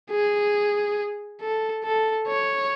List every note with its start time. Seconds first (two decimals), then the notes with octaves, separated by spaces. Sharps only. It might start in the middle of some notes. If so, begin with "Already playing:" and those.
0.10 G#4
1.41 A4
1.84 A4
2.27 C#5